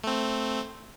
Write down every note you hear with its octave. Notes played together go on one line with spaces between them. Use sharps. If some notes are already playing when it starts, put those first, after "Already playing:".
A3 C4